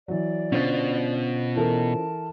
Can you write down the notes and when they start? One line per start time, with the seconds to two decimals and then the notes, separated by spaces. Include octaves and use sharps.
0.08 E3 F#3 D5
0.52 B2 D3 C#4 F4 C5 A6
1.56 E3 A4 A#4 A5